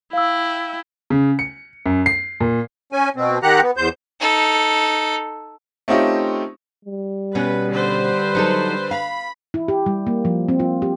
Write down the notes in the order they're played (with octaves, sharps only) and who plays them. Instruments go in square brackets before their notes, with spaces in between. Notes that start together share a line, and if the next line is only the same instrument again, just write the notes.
[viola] E4 G5 [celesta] F5 E6
[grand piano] C#3
C#7
F#2
C7
A#2
[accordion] C#4 G#5
B2 C4
D#3 G4 F#5 A#5 F#6
B3
E2 C5 G6
[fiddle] D#4 A4
[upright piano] A3 C4 C#4 D#4 F4 G4
[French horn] G3
[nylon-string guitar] B2 C#4 [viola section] B4
[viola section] D3 B4 C5
[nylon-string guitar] F#3 D#4 A4
[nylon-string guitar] F5 [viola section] B5
[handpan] E4
G4
G3
A#3
F3
C4
F4
G4